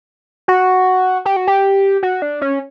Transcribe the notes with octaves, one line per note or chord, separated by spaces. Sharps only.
F#4
G4
F#4
G4
F#4
D4
C#4